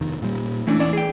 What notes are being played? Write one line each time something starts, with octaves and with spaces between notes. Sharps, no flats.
F1 D#3
A#2 G3
E3 A3 C#4 D4
E2 C#4 D5
G#4 G5